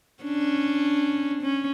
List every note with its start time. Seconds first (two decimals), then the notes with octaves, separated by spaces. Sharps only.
0.24 C#4 D4
1.42 C#4